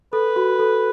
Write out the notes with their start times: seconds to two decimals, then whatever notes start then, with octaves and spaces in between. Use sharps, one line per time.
0.13 A4 B4
0.36 F#4
0.59 A4